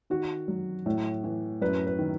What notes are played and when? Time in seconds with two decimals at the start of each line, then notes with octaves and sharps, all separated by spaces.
0.10 D#3 F#4
0.48 F#3
0.86 A2
1.24 E3
1.62 F#2 B4
1.87 B4
1.99 D#3